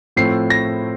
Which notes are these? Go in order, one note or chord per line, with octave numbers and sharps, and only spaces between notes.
A2 F3 A3 C4 C7
A#6